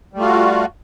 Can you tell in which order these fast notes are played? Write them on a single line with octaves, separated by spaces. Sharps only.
G3 A3 F4 F#4